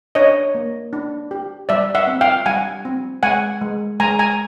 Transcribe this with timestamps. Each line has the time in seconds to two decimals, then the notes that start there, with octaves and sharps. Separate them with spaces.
0.15 D4 C#5 D#5
0.55 A#3
0.93 D4
1.31 G4
1.69 G3 D5 E5
1.95 E5 F#5
2.07 C4
2.21 F5 G5
2.46 G3 F#5 G#5
2.85 C4
3.23 G#3 F#5 G#5
3.61 G#3
4.00 G#3 G#5 A#5
4.19 G#5 A#5